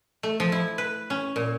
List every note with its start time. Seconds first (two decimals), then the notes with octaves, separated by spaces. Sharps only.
0.23 A3
0.40 F3
0.52 E4
0.78 B4
1.10 C#4
1.36 A#2